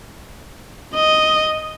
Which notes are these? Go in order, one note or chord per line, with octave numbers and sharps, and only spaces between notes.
D#5